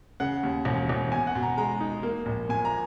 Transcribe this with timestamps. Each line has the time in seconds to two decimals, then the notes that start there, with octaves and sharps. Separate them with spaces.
0.20 C#3 F#5
0.43 D#2
0.65 E1
0.89 E1
1.12 B2 G#5
1.27 F#5
1.35 B2
1.43 A#5
1.57 G#3 A#5
1.80 D#4
2.03 A#3
2.26 A#1
2.49 A#2 G#5
2.65 A#5